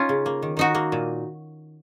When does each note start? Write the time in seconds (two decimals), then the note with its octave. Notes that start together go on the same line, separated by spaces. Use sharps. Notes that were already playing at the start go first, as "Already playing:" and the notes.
Already playing: C#4 D#4 F4
0.09 C#3
0.26 A#3
0.43 D#3
0.57 D#3 D#4 F#4
0.75 A#3
0.92 A#2